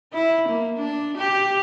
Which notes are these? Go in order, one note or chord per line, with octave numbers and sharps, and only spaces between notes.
E4
A#3
D4
G4